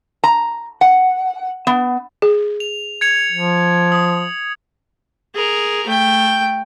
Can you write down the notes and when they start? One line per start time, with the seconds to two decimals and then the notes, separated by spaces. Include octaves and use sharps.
0.24 A#5
0.81 F#5
1.67 B3
2.22 G#4
2.60 F7
3.01 G#6 C#7 F7
3.32 F3
3.92 D#6
5.35 G#4 A#4
5.87 A3 G5